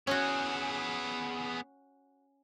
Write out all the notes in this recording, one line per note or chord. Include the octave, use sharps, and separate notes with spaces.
B3 C#4 F#4 G#4